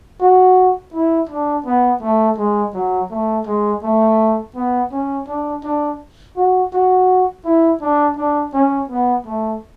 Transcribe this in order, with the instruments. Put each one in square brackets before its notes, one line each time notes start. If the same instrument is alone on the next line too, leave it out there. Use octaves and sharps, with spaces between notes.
[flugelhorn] F#4
E4
D4
B3
A3
G#3
F#3
A3
G#3
A3
B3
C#4
D4
D4
F#4
F#4
E4
D4
D4
C#4
B3
A3